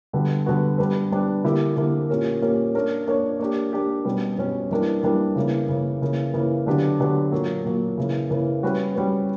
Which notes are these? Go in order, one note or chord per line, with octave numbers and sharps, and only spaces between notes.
D3 G3 B3 F#4
D3 G3 B3 F#4
G3 B3 D4 G4 B4
G3 B3 D4 G4 B4
D3 A#3 E4 G4
D3 A#3 E4 G4
A#2 A#3 C#4 G4 A#4
A#2 A#3 C#4 G4 A#4
A#3 D4 A#4 C#5
A#3 D4 A#4 C#5
A#3 D4 G4
A#3 D4 G4
B2 G3 C#4
B2 G3 C#4
E3 G3 A#3 D4 A#4
E3 G3 A#3 D4 A#4
C#3 E3 A#3
C#3 E3 A#3
C#3 E3 A#3
C#3 E3 A#3
D3 F#3 B3 D4 G4
D3 F#3 B3 D4 G4
A#2 F#3 A#3
A#2 F#3 A#3
C#3 E3 A#3
C#3 E3 A#3
G3 C#4 F#4 B4
G3 C#4 F#4 B4